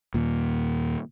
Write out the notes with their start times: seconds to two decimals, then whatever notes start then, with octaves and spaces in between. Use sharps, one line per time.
0.14 D#2 A#2